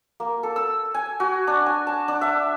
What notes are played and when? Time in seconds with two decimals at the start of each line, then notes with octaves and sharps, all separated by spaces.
0.20 A#3
0.43 A4
0.56 E6
0.94 G#5
1.20 F#4
1.47 D4
1.66 G#5
1.87 A5
2.08 D4
2.21 E5